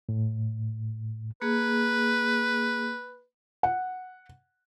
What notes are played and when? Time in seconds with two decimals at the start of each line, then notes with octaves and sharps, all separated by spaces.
0.09 A2
1.42 A#3 G#4 B4
3.63 F#5